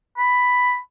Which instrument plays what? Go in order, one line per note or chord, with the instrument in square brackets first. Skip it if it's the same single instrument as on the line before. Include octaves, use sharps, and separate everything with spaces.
[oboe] B5